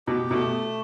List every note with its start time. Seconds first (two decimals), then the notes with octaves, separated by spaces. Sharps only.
0.08 B2 G4
0.31 B2 A3